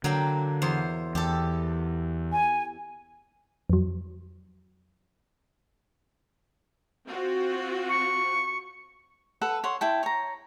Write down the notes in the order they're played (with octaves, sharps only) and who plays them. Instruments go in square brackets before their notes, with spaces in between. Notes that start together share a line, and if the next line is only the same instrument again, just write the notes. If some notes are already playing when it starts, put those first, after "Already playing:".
[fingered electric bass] D3 [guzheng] F#3 A#3 G5
[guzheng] E2 C5
[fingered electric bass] E2 [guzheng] G4 A4
[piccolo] G#5
[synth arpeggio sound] F2 F#3
[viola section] C4 F4 F#4
[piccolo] C#6
[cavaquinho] A4 B4 F#5
C#5 F#5 C6
E4 G5 A5
C#5 A#5